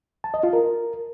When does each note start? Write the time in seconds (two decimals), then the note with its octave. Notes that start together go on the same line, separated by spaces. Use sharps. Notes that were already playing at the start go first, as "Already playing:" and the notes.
0.24 A5
0.34 D#5
0.43 F4
0.53 A#4